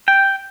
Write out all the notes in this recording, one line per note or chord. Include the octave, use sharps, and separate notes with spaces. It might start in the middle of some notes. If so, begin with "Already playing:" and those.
G5